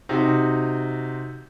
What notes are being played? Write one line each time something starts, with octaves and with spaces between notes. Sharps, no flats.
C3 D#4 F#4